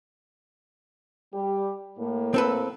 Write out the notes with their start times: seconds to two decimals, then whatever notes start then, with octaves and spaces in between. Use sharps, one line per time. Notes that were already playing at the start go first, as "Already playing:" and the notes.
1.33 G3 G4
1.98 A2 A#3
2.34 C4 A4 B4